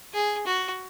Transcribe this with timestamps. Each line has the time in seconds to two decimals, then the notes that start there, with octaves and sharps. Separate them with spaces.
0.13 G#4
0.46 F#4